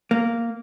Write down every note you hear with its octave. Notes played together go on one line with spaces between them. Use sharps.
A#3